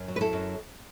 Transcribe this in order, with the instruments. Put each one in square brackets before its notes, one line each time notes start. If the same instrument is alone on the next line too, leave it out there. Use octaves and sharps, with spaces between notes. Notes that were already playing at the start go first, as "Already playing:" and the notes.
Already playing: [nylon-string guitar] F#2
F#3
B4
E4 A4
F#2